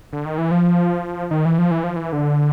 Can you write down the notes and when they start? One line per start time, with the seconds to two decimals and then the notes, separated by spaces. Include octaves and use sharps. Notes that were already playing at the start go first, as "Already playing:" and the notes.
0.13 D3
0.25 D#3
0.38 E3
0.51 F3
1.31 D#3
1.45 E3
1.58 F3
1.71 E3
1.84 F3
1.96 E3
2.13 D3